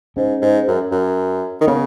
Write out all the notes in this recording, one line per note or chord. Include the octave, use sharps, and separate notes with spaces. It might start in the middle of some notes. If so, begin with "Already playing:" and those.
G#2 C#4
G#2
F#2
F#2
D#3
C#3 B3